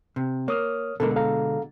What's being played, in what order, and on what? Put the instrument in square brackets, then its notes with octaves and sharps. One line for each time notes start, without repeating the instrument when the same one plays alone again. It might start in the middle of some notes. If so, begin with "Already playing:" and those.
[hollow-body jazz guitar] C3
[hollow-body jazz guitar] A#3 [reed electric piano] C#5 D#6 F6
[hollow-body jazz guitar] B2 D3 G#3 [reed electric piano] A4 A#4
[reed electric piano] A4 F5 A#5